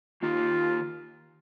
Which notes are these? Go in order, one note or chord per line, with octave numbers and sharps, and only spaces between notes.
D#3 A#3 D#4 F4 G4